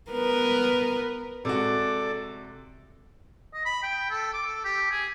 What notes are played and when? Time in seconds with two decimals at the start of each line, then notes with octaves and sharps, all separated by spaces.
0.12 B3 A#4 B4
1.45 C3 G#3 F#4 A4 D5 D6
3.54 D#5
3.65 B5
3.83 G5
4.10 A4
4.34 D6
4.46 A4
4.65 G4
4.91 G#4